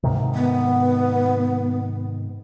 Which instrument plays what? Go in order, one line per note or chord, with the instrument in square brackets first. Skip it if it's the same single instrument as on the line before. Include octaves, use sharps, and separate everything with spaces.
[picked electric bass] G#2 C3 D#3
[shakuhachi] B3